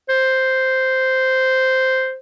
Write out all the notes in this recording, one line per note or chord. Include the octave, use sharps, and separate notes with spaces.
C5